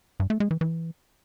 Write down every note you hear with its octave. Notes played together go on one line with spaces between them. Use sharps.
G2
A3
G#3
E3
E3